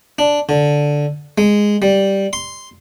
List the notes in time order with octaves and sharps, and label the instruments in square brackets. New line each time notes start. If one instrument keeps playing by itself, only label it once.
[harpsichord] D4
D3
G#3
G3
C6